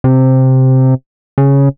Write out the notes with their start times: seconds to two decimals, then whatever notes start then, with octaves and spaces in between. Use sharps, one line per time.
0.04 C3
1.38 C#3